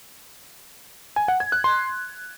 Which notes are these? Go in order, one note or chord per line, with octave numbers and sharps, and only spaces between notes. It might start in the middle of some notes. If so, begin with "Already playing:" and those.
G#5
F#5
G#6
F#6
C6